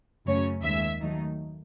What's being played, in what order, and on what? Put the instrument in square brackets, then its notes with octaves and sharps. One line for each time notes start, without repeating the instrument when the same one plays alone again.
[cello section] F#2 C#3 F#3 A3 C#4 [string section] C#5
[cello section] D#2 D#3 G#3 [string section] E5
[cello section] D#3 F#3 A3 D#4